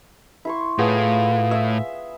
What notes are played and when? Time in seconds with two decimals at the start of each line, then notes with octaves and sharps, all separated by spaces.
0.45 E4 C6 C#6
0.78 A2 B3 F4 G#4
1.51 E5